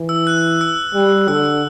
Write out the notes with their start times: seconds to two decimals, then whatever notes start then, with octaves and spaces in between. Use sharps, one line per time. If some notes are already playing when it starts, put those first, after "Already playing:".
Already playing: E3
0.09 E6
0.27 F#6
0.61 E6
0.94 G3
1.28 D3 E6
1.45 E6